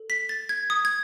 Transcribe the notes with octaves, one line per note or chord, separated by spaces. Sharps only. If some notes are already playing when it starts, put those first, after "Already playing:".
Already playing: A4
B6
A6
G#6
D#6
G#6